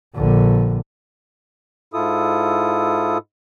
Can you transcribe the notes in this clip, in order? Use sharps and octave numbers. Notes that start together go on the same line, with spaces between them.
A#1 D3
G#2 E4 F4 A4 D#6